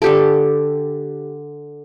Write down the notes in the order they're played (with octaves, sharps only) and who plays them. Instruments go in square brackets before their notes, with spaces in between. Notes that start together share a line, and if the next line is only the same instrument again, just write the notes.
[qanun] D3 G4 A4